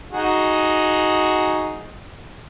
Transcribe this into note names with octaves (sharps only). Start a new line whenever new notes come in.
D#4 F#4 G#4